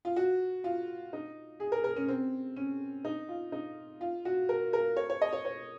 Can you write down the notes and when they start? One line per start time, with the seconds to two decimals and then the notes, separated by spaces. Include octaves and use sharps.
0.05 F4
0.16 F#4
0.64 F4
1.13 D#4
1.60 G#4
1.72 A#4
1.84 A#4
1.96 C#4
2.08 C4
2.56 C#4
3.05 D#4
3.29 F4
3.52 D#4
4.01 F4
4.25 F#4
4.49 A#4
4.73 A#4
4.97 C#5
5.10 C#5
5.21 D#5
5.33 C#5
5.45 C#5